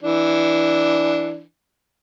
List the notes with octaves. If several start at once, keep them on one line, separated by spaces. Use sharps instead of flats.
E3 D4